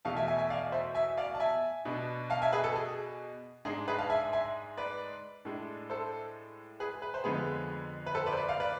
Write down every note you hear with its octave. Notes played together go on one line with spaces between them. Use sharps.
E2 B2 A3 F5 A5
E5 G#5
E5 G#5
E5 G#5
D5 F5
C5 E5
E5 G#5
D5 F5
A5
E5 G#5
B2 B3 D4
F5 A5
E5 G#5
G#4 B4
A4
G#4
G#2 G#3 D4 G#4
G#4 B4
F5 A5
E5 G#5
E5 G#5
B4 D5
A2 G#3 D4
A4 C5
G#4 B4
B4
C5
F2 D3 F3 G#3 B3 G#4 B4
B4
A4 C5
B4 D5
C5
B4 D5
D5 F5
B4 D5